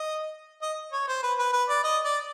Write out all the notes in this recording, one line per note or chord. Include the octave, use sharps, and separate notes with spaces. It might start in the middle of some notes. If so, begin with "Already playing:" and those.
Already playing: D#5
D#5
C#5
C5
B4
B4
B4
D5
D#5
D5